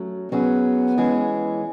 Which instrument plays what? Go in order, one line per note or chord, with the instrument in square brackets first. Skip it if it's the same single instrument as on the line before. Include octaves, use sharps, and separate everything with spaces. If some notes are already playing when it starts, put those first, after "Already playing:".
Already playing: [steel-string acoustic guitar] F#3 A3 C#4
[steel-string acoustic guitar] F#3 C#4 G#4 [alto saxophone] B3
[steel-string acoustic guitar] E3 G#3 C#4 G#4